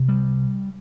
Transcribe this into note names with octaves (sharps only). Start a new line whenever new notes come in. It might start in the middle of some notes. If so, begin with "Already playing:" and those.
Already playing: C3
G3